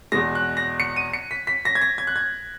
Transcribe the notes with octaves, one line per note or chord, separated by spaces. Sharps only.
E2 B2 G#3 A#6
F#6
A#6
C#7
D#7
C#7
B6
B6
A#6
G#6
A#6
G#6
F#6
G#6